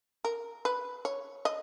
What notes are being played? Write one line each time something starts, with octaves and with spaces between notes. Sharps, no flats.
A#4
B4
C#5
D#5